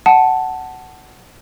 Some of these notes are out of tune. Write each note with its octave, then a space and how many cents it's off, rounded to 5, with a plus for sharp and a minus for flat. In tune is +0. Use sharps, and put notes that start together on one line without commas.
F#5 +15 A5 +0